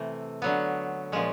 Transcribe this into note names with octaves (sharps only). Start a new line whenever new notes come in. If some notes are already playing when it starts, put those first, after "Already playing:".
Already playing: C3 E3 A3
D3 F#3 B3
A#2 F3 G#3 C#4